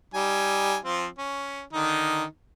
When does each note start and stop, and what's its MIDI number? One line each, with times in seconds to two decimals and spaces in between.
0.14 0.77 55
0.14 0.77 63
0.14 0.77 80
0.84 1.07 53
0.84 1.07 60
0.84 1.07 65
1.18 1.62 61
1.73 2.24 50
1.73 2.24 51
1.73 2.24 63